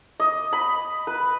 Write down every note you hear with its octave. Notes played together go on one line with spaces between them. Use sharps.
D#5
B5
B4